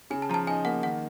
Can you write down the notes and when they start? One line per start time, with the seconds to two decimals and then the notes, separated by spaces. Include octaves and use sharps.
0.11 C#3 G#5
0.22 A5
0.29 F3 A#5
0.34 A5
0.47 D#4 G#5
0.65 A#3 F#5
0.83 D#3 F#5